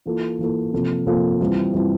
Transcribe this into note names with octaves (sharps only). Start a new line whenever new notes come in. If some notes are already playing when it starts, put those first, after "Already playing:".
E3 A#3 F4 A4
E3 A#3 F4 A4
C3 F3 A#3 F4 A4
C3 F3 A#3 F4 A4
E3 G3 C4 F4
E3 G3 C4 F4